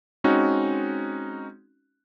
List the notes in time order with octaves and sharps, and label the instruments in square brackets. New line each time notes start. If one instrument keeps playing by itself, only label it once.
[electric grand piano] G#3 C4 C#4 D#4 F#4